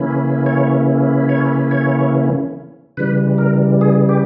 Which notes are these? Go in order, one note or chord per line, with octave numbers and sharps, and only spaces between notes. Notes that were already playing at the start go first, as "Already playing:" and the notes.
Already playing: C#3 E3 A#3 C#4 E4
C#5
C#5
C#5
C#3 E3 G3 B4
A#4
G#4
G4